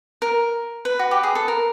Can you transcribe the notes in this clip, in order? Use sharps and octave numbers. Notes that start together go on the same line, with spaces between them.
A#4
B4
F#4
G4
G#4
A4
A#4